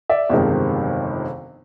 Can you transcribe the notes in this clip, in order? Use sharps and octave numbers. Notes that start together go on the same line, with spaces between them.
D5 E5
G1 F2 C3 D#3 G#3